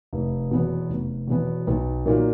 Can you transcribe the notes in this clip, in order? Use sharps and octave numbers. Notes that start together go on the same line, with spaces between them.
F1
E2 B2 F#3 B3
F1
E2 B2 F#3 B3
B1
A#2 F#3 A#3 D#4